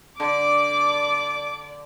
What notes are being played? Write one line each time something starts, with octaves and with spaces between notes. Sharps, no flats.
D3 D5 D6